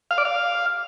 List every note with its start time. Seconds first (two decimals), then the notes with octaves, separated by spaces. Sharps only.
0.11 F5
0.18 D5
0.25 F5